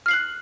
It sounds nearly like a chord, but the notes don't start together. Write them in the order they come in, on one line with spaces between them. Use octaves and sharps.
F6 C7 F#7 F#6